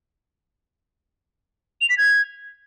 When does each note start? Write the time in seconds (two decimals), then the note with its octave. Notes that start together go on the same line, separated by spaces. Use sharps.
1.81 F7
1.90 B6
1.98 G#6